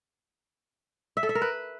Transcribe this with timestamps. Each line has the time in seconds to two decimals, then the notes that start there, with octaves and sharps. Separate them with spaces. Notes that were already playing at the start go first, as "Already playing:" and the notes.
1.17 E5
1.23 A4
1.29 E5
1.35 A#4
1.42 B4